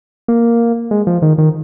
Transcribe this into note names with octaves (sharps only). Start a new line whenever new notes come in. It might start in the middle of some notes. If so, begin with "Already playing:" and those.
A#3
G#3
F3
D#3
D#3